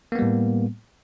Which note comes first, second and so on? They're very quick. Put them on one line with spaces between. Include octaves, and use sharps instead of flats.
A#3 B3 G3 A2